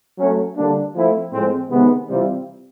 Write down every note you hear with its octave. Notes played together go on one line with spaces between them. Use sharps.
F#3 A3 C#4
D3 G3 A#3 D4
F3 A3 C4 E4
A2 F3 G#3 C4
C3 D#3 G#3 B3
C3 E3 G3 C4 F4